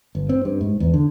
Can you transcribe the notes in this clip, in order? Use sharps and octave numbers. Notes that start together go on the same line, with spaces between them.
G1
C4
G2
G#2
E2
D3